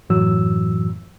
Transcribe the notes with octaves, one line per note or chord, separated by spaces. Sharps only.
F#2 A2 E3 F#3 E6